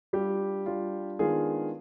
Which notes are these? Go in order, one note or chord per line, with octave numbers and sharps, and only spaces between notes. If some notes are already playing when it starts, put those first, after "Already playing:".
G3 D4 F4 G4
G3 D4 F4
D#3 G#3 B3 D4 F4 G#4